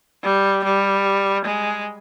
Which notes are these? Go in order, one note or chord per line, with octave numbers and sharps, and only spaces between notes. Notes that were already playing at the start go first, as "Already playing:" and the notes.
G3
G3
G#3